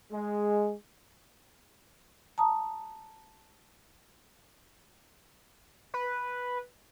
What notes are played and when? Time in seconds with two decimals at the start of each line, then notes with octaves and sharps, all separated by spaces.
0.12 G#3
2.38 A5 A#5 D#6
5.94 B4